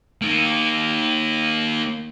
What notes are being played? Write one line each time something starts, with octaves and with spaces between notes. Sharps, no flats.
A#3 D#4